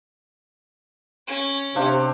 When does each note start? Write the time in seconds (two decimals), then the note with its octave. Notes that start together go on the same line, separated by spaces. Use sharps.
1.27 C#4
1.76 C3 D4 C5 F5